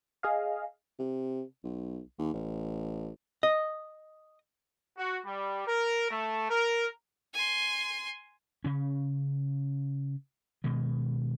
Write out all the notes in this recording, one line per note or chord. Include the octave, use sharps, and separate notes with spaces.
G#4 D#5 F5
C3
B1
D#2
A1
D#5
F#4
G3
A#4
A3
A#4
G#5 C6
C#3 C#4
B2 D#3 G#3